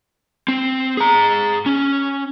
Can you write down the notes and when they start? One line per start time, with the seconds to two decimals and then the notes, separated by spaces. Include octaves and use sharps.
0.48 C4
0.97 G#4 A#5
1.66 C#4